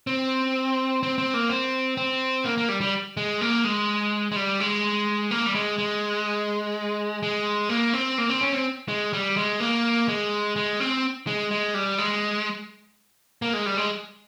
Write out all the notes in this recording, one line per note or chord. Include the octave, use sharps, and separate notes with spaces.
C4
C4
C4
A#3
C4
C4
A#3
A#3
G3
G3
G#3
A#3
G#3
G#3
G3
G#3
A#3
G3
G#3
G#3
G#3
A#3
C4
A#3
C4
C#4
C4
G#3
G3
G#3
A#3
G#3
G#3
C4
G#3
G#3
G3
G#3
A#3
G#3
G3
G#3